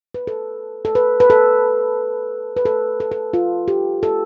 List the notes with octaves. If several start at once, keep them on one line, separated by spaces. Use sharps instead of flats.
B4
A4
A4
B4
B4
A4
B4
A4
A4
A4
F4
G4
A4